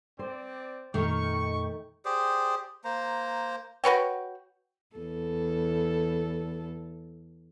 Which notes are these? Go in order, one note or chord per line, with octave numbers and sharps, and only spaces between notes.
C4 C5 D5
F2 A#2 D#3 A3 A#4 C#6
G4 G#4 C5 D5
A#3 C5 A#5
F#4 B4 C#5 G5
E2 A4